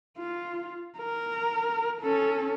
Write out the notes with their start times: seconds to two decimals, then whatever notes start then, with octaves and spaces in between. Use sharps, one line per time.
0.18 F4
0.97 A#4
2.01 C#4 A4